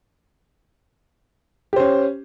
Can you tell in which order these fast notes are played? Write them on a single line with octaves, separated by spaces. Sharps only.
G4 C5 C#4